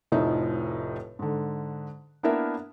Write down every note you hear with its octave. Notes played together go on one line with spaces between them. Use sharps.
F1 A2 F3 D#4 E5
G#2 D3
A#3 B3 D4 E4 A#4 E5